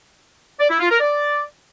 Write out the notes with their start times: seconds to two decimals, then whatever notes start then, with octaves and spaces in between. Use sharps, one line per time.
0.60 D5
0.70 E4
0.80 F4
0.90 A#4
1.00 D5